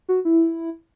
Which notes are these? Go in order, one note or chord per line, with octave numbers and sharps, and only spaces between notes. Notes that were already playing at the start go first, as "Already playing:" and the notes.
F#4
E4